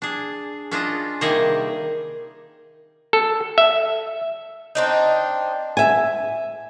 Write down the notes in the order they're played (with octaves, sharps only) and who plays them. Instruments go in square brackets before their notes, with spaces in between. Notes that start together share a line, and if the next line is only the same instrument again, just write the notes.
[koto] D4 G#4
C#4 D4 F4 D#5
C3 D#3 G3 A#3 G#4 D#5
[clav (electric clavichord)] A4
E5
[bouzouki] C4 D4 D#4
[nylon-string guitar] E5 G#5